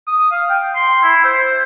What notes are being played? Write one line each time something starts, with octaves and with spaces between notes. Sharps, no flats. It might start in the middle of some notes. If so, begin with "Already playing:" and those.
D#6
F5
G5
C6
E4
C5